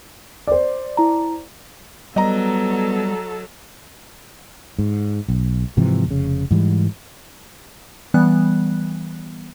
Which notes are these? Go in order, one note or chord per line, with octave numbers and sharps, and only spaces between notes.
C5 D5
E4 A#5
F#3 G3 B3 A4 D#5 A#5
G#2
B1
G#2 C3 E3 F3
F1 C#3
G#2 E3 G3
E3 G3 B3 F#6